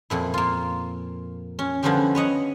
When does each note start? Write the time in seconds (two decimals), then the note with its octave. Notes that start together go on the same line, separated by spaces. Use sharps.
0.10 F2 A#2 E4
0.34 A#3 F4
1.59 C#4
1.83 D3 F3 G3 B3 C#4 G4
2.15 B4 C#5 D#5 F#5